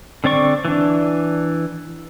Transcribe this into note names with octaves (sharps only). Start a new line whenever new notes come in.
D3 C4 D5 C#6
E3 D4